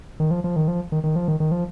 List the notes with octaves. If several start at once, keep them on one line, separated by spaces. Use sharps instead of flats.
D#3
F3
F3
D#3
F3
D#3
D#3
F3
D#3
D#3
F3